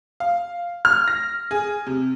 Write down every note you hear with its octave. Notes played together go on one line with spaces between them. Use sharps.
F5
F6
A#6
G#4
C3